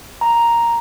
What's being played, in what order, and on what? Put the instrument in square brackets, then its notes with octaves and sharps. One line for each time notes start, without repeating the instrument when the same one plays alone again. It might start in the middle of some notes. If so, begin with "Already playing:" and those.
[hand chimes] A#5